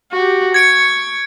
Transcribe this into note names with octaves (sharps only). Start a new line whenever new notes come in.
F#4 G4
C#6 G#6 C#7 D7